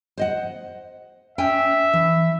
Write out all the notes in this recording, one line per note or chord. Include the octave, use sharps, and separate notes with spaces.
C5 D#5 F#5
C#4 E5 G5 G#5
E3